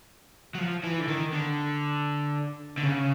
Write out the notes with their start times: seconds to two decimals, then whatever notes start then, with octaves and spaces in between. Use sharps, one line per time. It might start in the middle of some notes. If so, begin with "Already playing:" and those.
0.55 F#3
0.59 F3
0.84 E3
1.00 D3
1.09 D#3
1.33 D3
2.78 D3
2.83 C#3